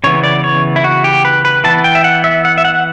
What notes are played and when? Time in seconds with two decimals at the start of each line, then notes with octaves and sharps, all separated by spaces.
0.04 C#3 E3 B3 C#5
0.24 D5
0.44 C#5
0.76 E4
0.84 F#4
1.04 G4
1.25 B4
1.45 B4
1.64 E3 B3 A5
1.84 G5
1.95 E5
2.04 F#5
2.24 E5
2.45 F#5
2.58 E5
2.65 F#5